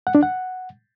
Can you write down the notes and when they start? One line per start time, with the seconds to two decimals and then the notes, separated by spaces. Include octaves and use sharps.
0.07 F#5
0.15 D4
0.23 F#5